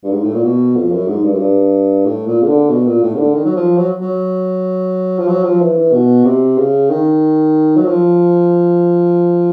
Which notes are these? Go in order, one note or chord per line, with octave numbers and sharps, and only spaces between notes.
G2
G#2
A2
A#2
B2
F2
F#2
G#2
G2
F#2
G2
A2
A#2
C#3
D3
B2
A#2
A2
C#3
D3
D#3
F#3
F3
F#3
F#3
F3
F#3
F3
E3
E3
B2
C3
C#3
D#3
F#3
F3